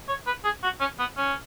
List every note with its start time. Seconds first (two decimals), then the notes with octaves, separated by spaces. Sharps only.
0.08 C#5
0.27 B4
0.44 G#4
0.63 F#4
0.80 C#4
0.99 B3
1.17 C#4